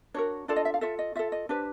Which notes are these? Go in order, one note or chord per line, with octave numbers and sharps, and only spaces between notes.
D4 F#4 A#4 C#5
D4 F4 A4 D5
D#5
E5
F5
F4 A4 E5
D#5
F4 A4 E5
D#5
D4 G4 B4 C5